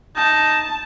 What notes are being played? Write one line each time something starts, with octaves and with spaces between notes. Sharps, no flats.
D#4 A5